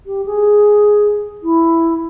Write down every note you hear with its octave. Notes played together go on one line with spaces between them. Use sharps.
G4
G#4
E4